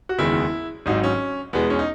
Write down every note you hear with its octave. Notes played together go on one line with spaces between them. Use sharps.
F#4
F#1 E2 D#3 G#3 E4
G#1 G#2 F#3 D#4
C#4
E2 B2 G#3 B3
C#4
D#4